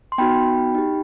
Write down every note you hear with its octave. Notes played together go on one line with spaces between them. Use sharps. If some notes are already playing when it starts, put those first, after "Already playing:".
C6
B3 D#4 F#4 G5 B5
D#4 G4